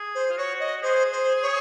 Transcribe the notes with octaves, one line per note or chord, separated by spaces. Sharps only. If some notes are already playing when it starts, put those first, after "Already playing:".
Already playing: G#4
C5
F4
F#4 C#5
D#5
G#4 C5
C5
C#5